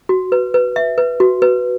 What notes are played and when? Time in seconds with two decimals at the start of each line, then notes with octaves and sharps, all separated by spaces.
0.09 F#4
0.32 B4
0.54 B4
0.76 E5
0.98 B4
1.20 F#4
1.42 B4